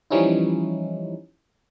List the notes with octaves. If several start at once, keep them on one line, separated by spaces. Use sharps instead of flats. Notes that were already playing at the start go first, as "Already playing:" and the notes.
E3 F3 G3 C#4 D#4 E4